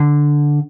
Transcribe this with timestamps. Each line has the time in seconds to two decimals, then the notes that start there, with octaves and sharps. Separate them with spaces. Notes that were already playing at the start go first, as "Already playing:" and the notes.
Already playing: D3